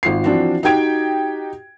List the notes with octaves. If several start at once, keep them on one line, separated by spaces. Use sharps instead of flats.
G#1 F4 C7
E3 F3 C4 D4 F4 F#4
D#4 F#4 G4 G5 G#6 D7